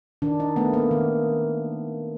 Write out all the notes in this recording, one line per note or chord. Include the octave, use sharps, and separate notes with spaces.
D#3 D4
D#4
A3 B3
A#3
D#3